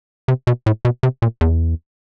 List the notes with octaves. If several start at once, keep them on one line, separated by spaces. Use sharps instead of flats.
C3
B2
A2
B2
C3
A#2
E2